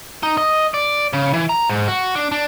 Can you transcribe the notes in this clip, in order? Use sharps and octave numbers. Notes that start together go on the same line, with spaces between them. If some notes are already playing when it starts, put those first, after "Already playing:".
D#4
D#5
D5
C#3
E3
A#5
G#2
F#4
D4
D4